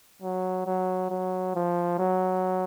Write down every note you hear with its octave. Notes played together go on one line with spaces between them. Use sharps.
F#3
F#3
F#3
F3
F#3